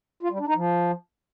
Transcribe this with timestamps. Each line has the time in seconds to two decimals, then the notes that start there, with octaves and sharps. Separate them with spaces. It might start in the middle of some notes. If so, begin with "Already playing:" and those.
0.23 F4
0.31 G3
0.39 D4
0.47 D#4
0.56 F3